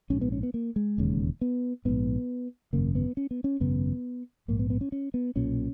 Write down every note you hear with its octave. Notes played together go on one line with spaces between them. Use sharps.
A#1 G#2 C#4
B3
C#4
B3
A#3
G#3
E1 D#2 C#3
B3
A#1 G#2 B3
G#1 F#2 C#3 A#3
B3
C#4
B3
C#4
G#1 F#2 C#3 B3
A#1 G#2 A#3
B3
B3
C#4
C#4
B3
B1 A#2 C#4